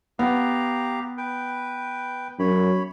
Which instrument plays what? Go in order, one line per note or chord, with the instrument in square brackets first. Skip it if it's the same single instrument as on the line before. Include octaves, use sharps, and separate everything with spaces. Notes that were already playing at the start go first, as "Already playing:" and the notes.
[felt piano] B3 [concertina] G4 F5 A#5
[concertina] B4 G5
[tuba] F#2 [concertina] C#5 B5